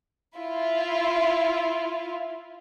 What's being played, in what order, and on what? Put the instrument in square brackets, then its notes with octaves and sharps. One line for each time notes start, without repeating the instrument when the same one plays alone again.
[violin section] E4 F4